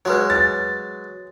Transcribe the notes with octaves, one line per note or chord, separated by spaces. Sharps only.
F#3 G#3 B4 C#5
A6